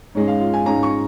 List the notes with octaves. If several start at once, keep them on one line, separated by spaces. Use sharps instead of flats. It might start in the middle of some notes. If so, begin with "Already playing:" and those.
G#2 G#3 C#4 C#5
F5
F4
G#5
G#2 G#3 C#4 A#5
C#6